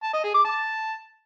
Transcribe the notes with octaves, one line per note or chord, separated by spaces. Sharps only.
A5
D#5
G#4
D6
A5